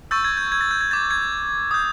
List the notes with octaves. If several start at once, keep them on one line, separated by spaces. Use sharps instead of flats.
C#6 E6 G6 A6
G#6
G6
G#6
A6
G6
G#6
D6 G6 A6
G#6
D#6 G6